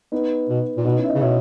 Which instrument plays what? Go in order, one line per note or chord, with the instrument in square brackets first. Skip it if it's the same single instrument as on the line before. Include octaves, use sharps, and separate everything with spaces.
[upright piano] B3 D#4
[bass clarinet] B2
A#2
[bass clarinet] B2 [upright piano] B3 D#4
[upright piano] C#4 E4
E5
B4 D#5
[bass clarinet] C#3
[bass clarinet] B2 [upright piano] C#5 E5